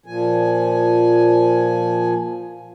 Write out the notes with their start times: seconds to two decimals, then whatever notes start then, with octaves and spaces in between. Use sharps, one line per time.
0.06 A#2 F3 G#5